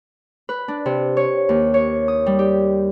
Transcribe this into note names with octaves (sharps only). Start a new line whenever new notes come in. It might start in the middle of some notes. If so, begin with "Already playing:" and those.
B4
D4
C3
C#5
D#2
C#5
D#6
G3
G4